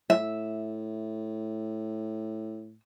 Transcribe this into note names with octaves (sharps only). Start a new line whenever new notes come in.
A2 E5